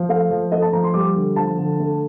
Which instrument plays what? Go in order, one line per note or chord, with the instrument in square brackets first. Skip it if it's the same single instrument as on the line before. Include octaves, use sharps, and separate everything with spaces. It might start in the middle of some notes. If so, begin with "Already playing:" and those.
Already playing: [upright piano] F3
A3 F5
F3
A3 D#5
A5
F3 A#5
C6
G3 D6
D3
F3 A5
D3
A3